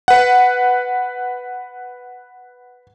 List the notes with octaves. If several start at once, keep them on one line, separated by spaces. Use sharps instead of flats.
B4 F#5